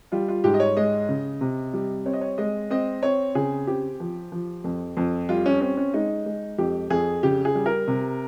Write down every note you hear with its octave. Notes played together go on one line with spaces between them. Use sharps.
G3 F4
F4
G#2 G4
D#5
C#5
G#3 D#5
C#3
C3
G3
C4 C#5
D#5
C#5
G#3 D#5
C4 D#5
C4 C#5
C#3 G#4
C4 G4
F3
F3
F2
F2
G3 F4
C#4
C4 C#4
C#4
G#3 D#4
G#3
F2 G4
F2 G#4
C#3 G4
G#4
G3
A#4
C3